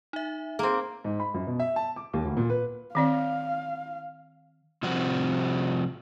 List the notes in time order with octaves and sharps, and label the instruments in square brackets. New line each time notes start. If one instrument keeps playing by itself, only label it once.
[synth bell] D#4 E5
[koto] A#3 C4 [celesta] G#4 C6
[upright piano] G#2
B5
F#2
B2
E5
A5
D6
D#2
D2
A#2
B4
[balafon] D#3 C4 D5 [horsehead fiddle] F5
[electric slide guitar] C3 F3 G3 C4 F#4